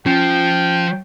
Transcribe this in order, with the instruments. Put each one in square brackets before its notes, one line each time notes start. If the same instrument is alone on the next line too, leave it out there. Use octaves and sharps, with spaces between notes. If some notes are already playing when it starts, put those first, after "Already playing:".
[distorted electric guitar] F3 [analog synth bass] C#4 [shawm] G5